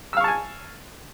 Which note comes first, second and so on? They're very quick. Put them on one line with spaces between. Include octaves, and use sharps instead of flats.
E6 F5 C#6 A5 G#5